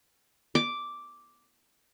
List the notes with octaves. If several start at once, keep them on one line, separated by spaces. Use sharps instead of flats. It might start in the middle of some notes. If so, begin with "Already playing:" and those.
D6